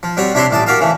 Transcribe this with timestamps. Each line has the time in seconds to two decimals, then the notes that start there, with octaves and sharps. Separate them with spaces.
0.03 F3
0.17 G3 C4 F#4 C#5
0.34 C3 D4 E4 C#5 A#5 C6
0.51 A1 A2 D5 A5 D#6
0.66 F#4 G4 A#4 F5 A5
0.81 C#3 E3 A3